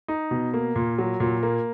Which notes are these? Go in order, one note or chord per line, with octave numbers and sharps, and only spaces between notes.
D#4
B2
A#3
A#2
F#3
A#2
A#3